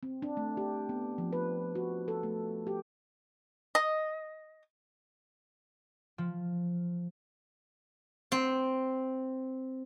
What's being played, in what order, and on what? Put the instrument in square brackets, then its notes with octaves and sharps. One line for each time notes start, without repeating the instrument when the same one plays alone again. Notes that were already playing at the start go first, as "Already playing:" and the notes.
[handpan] C4
D4
A3
G4
B3
F3
B4
F#4
A4
A3
G4
[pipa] D#5
[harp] F3
[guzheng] C4